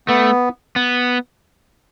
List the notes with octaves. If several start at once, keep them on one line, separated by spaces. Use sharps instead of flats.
A3 B3
B3